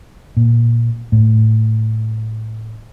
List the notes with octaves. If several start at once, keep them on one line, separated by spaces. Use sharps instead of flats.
A#2
A2